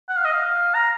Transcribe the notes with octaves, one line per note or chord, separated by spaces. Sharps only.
F#5
F5
D#5
F5
A#5